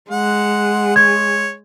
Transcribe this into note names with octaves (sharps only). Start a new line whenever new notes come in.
G#3 F#5
C#5 G#6